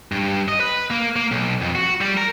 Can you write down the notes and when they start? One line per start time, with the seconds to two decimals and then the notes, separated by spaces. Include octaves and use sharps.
0.12 G2
0.48 D#5
0.60 B4
0.90 A#3
1.16 A#3
1.31 B1
1.62 F2
1.75 F#4
2.01 G3
2.17 A#4